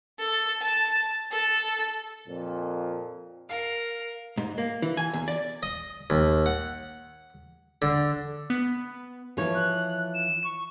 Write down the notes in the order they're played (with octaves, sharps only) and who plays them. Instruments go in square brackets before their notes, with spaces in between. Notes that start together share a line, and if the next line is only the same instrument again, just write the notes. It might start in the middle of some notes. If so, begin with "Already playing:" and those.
[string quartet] A4
A5
A4
[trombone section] F2 A#2
[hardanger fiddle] A#4 [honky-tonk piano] F5
[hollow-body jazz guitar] G#2
A#3
E3
G#5
E2
D5
[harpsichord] D#5
D#2
F#5
D3
[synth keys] B3
[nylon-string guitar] E3 F3 C#5
[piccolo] F#6
E7
C#6